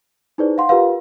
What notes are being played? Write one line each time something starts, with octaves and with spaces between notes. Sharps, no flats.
D#4 E4 G#4 B4 C5 D5
F5 F#5 C6
F4 G4 A#4 B4 F5